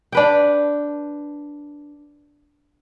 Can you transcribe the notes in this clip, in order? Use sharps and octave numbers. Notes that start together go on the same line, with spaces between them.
D4 B4 G5